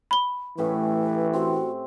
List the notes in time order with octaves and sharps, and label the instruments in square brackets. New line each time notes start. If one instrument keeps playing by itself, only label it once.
[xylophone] B5 G7
[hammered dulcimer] A2 C#4 G4 [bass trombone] E3 [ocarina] B4
[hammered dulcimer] C4 [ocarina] F#4